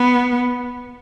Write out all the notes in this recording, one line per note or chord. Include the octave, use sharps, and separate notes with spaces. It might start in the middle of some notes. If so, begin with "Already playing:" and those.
Already playing: B3